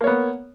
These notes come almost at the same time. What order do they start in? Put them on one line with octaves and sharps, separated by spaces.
A#3 C#5 B3